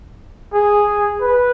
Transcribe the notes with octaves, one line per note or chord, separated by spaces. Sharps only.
G#4
B4